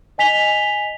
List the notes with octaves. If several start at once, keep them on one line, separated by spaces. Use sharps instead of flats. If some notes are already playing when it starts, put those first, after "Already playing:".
D#5 G#5 B6 F7 G7